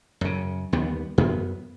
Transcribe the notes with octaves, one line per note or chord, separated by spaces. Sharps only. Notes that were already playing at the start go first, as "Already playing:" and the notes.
F#2 C#3
D#2 G3 B3
F#2 B3